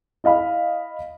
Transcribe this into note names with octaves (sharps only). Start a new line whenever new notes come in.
E4 D#5 F5 B5